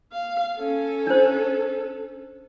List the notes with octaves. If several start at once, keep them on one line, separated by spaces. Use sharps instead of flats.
F5
C#4 A4
D4 C5